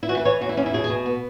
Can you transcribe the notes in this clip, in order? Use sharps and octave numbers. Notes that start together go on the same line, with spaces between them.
E4
E3 F#4
B4
E3 C#5
E2 F#4
E4
E2 C#4
E4
B2 G#4
G#4
B2
B3